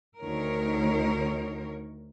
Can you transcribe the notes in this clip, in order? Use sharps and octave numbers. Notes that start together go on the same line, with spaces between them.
D2 D#3 A#4 C#5